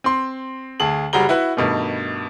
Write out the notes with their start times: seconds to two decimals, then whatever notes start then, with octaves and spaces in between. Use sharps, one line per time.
0.04 C4 C6
0.80 D2 G#4 A5 F#7
1.13 F#1 G3 F#4 G#4 A#5 G7
1.29 E4 F#4 B4 F#5
1.57 G2 B2 D#3 A3